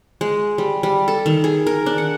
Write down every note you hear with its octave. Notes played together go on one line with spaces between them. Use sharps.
G#3
G3
G3
A4
D#3
G#4
A#4
D4
F#5